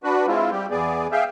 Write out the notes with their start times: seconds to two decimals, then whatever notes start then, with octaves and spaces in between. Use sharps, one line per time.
0.04 D4 F#4 B4
0.27 G#3 C4 E4 F4
0.51 G3 G4
0.71 E2 B3 G#4 D5
1.12 G#4 E5 F5 G5